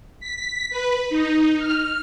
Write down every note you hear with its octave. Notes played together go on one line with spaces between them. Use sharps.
B6
B4
D#4
F6